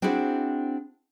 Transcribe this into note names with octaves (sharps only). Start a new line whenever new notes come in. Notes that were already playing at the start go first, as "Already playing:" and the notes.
C4 D4 E4 F#4 G#4 C5